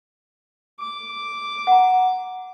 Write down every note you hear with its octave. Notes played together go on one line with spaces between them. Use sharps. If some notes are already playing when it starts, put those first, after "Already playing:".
D6
F#5 A#5